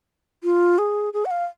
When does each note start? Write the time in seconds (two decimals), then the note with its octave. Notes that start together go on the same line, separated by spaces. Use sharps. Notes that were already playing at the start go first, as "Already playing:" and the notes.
0.44 F4
0.78 G#4
1.13 G#4
1.25 F#5
1.31 F5